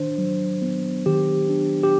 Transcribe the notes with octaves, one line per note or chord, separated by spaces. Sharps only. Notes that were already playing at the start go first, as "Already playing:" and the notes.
Already playing: D#3 D4 C5
F#3
B3
D#3 G4
D4
G4